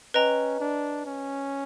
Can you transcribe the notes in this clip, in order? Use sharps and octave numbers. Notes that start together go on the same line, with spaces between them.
C#4 B4 D#5 G5 A#5
D4
C#4